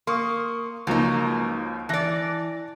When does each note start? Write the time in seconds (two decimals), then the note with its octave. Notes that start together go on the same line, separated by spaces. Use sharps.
0.07 A#3 C6 C#6 D#6
0.87 C#2 F3 F#3 A#3 D#4
1.89 E3 D5 A5 F#6 A#6